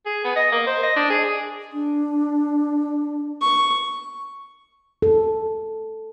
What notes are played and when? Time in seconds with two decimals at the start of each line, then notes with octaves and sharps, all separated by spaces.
0.06 G#4
0.24 B3
0.36 D#5
0.52 A#3
0.67 C5
0.83 D#5
0.96 D4
1.10 G#4
1.73 D4
3.41 C#6
5.02 A4